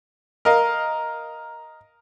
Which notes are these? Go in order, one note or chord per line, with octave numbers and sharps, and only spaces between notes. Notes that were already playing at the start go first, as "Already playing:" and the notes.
A#4 D#5 F5